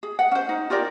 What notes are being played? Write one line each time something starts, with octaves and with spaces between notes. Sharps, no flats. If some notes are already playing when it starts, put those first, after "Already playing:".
G#4
F#5
C#4 C5
D#4
F4 G4 A#4 D5